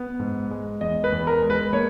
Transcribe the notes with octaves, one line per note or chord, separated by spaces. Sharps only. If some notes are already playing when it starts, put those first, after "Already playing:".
Already playing: B3
G#2
G#3
E2 D#5
B4
E2
A#4
G#3
B4
A#3 C#5